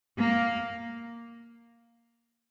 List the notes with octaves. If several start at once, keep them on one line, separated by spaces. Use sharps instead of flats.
A#3